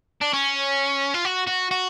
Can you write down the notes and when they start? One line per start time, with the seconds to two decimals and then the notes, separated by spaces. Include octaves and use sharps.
0.21 D4
0.33 C#4
1.14 F4
1.25 F#4
1.47 F#4
1.71 F#4